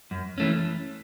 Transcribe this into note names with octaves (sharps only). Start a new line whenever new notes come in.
F#2
E3 A3 C#4